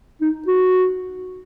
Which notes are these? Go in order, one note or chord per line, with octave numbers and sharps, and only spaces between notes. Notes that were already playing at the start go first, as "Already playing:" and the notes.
D#4
F#4